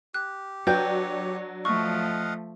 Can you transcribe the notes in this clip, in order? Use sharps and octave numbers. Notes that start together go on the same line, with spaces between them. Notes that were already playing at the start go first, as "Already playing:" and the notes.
G4 F#6
F#3 D4 B4 C#5 G5 G6
F3 A3 D#5 F5 F#5 C#6